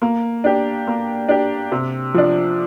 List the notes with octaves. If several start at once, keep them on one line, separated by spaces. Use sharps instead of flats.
A#3
D4 G4
A#3
D4 G4
C3
F3 D4